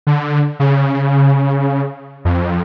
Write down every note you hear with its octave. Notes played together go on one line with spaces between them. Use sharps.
D3
C#3
F2